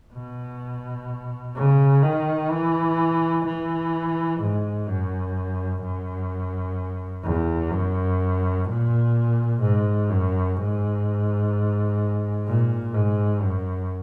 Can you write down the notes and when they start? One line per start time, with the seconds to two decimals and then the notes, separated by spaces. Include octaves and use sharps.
0.13 B2
1.55 C#3
2.03 D#3
2.51 E3
3.45 E3
4.40 G#2
4.88 F#2
5.82 F#2
7.24 E2
7.72 F#2
8.67 A#2
9.62 G#2
10.10 F#2
10.56 G#2
12.47 A#2
12.94 G#2
13.42 F#2